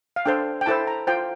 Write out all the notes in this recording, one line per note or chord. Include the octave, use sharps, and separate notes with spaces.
F5
D4 A4 C5 G5
G5
E4 A4 C5 A5
A#5
F4 C5 G5